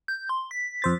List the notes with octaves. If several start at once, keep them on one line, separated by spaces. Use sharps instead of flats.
G6
C6
B6
F2 C5 A6